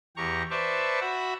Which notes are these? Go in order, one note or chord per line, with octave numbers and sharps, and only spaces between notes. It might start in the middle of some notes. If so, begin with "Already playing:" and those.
E2 G4 A#5 C#6
B4 C5 D5 E5 A5 C#6
F#4 E5 F#5 B5